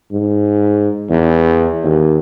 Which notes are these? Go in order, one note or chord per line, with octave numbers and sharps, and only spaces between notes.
G#2
E2
D#2